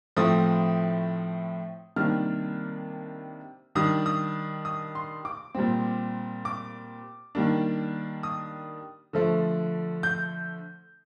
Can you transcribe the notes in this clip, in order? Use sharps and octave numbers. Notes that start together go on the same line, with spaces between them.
A2 F3 A3 C4 D#6
C3 D#3 G3 A#3 D4 F6
D#3 G3 D4 D#6
D#6
D#6
C6
D6
A#2 G3 C4
D6
D#3 G3 A#3 D4
D#6
D3 F3 A3
G6